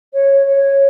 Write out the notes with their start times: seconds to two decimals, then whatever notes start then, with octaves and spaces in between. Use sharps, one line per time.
0.13 C#5
0.45 C#5